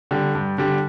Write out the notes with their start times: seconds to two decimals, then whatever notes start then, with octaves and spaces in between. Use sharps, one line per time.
0.11 D3 G3
0.35 G2
0.58 D3 G3